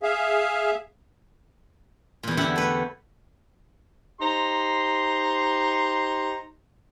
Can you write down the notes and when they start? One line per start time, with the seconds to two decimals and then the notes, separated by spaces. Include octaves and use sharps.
0.03 G#4 E5 F5
2.23 E2 A#2
2.37 E2 D3 E4 G4 F#5
2.56 A3 B4
4.21 D#4 G4 C5 A#5 C6